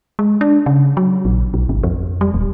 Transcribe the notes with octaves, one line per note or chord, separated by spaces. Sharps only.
G#3
D4
C#3
F#3
A#1
B1
G#1
F2
G3
D#1